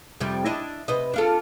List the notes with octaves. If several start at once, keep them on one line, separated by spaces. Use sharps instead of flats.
F2 C3 G3
D4 E4 D#5
C3 B4 D#5
D4 F4 A4